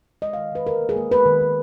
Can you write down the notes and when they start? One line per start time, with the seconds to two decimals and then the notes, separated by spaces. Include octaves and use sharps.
0.22 G#3 D#5
0.33 F5
0.37 D#3
0.52 D#3 B4
0.66 D3 A#4
0.81 A#3
0.89 G#4
0.96 A#3
1.11 G#3 B4
1.26 D#3
1.41 D#3